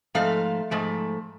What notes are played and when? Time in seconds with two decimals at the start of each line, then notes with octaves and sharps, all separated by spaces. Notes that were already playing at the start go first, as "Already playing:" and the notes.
0.15 G#2 F3 A3 F5
0.71 G#2 F3 A3